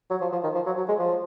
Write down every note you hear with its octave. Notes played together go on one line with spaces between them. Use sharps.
F#3
F3
F3
D#3
F3
F#3
F#3
G#3
F3